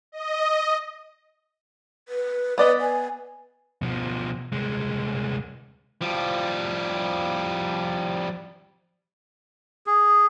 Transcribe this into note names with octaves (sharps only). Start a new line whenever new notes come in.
D#5
B4
B3 B4 D5 D#5
G#5
B2 F3
C2 G#3
F3 G3
G#4